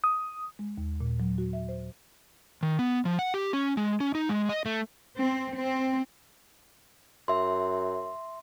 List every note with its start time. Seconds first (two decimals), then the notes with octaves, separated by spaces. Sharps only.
0.04 D#6
0.59 G#3
0.78 D#2
1.01 A#2
1.20 F#3
1.38 F#4
1.53 E5
1.69 C5
2.63 D#3
2.79 B3
3.05 F3
3.19 F#5
3.34 G4
3.53 C#4
3.77 G#3
4.00 C#4
4.15 D#4
4.29 G#3
4.49 D#5
4.66 A3
5.16 C4
5.56 C4
7.28 F#2 E5 C6